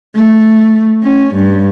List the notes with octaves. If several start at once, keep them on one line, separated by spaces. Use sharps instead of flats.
A3
C#4
G2